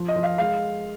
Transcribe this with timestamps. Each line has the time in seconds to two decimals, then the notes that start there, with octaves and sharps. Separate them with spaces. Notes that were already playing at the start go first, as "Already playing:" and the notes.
Already playing: F3
0.08 D#5
0.16 F3
0.23 F5
0.38 G#3 F5